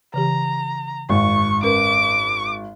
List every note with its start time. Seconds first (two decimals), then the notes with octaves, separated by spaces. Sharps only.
0.14 C#3 E3 G4 A#5
1.09 G#1 F#2 C#6
1.63 C#4 A#4 B4 D6